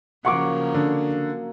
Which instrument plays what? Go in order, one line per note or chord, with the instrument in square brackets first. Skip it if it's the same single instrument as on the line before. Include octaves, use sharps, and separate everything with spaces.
[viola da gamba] C#3 F3 [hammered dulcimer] F#3 A#3 [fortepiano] F#5 C#6 D6
[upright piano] D3